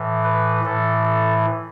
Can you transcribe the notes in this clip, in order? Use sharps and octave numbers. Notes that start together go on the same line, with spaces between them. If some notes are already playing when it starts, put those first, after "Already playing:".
Already playing: A2 E3
B4
A2 E3 A4
A4